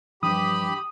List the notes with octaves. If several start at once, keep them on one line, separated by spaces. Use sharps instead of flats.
G2 E3 F3 G4 B5 D#6